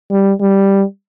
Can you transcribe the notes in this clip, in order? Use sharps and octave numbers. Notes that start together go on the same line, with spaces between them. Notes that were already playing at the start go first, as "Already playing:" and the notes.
G3
G3